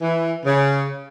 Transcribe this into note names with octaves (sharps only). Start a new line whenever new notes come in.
E3
C#3